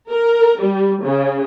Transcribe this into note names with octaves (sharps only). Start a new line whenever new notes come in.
A#4
G3
C#3